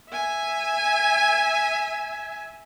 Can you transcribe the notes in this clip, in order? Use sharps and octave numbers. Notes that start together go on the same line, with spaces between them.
E5 G#5